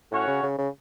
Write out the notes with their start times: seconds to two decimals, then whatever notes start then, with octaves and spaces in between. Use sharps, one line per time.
0.12 A2 C#4 F#4 C#5 F#5
0.27 C#3
0.43 C#3
0.58 C#3